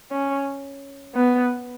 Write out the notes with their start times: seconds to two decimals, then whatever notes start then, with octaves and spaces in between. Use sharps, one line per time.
0.11 C#4
1.15 B3